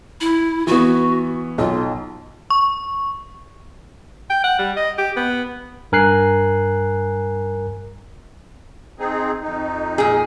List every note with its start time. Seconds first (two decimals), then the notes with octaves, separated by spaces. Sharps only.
0.21 E4
0.67 E3 B3 F#4
1.58 B1 F4
2.50 C#6
4.30 G5
4.44 F#5
4.59 G3
4.77 D#5
4.98 G4
5.16 B3
5.92 G2 A#4 G#5 F#6 C7
8.99 C4 D#4 G#4
9.42 F2 D#4
9.98 A#2 G#4